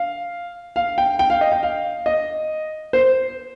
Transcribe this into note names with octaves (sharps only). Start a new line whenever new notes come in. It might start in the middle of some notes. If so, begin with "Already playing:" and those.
Already playing: F5
F5
G5
G5
F5
D#5
G5
F5
D#5
C5